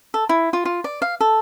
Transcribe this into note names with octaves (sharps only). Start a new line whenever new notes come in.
A4
E4
F4
F4
D5
F5
A4